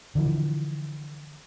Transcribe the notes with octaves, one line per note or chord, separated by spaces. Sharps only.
D3 E3 F3